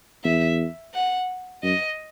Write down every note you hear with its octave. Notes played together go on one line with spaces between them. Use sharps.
E2 E5
F#5
F#2 D#5